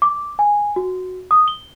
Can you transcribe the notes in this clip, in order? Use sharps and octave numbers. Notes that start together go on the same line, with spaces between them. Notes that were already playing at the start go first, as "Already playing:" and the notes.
D6
G#5
F#4
D#6
G7